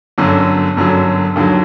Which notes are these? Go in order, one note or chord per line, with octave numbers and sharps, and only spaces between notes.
G1 F#2 D3 F#3
G1 F#2 D3 F#3
D#2 D3 F#3